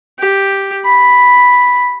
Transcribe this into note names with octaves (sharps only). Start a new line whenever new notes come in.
G4
B5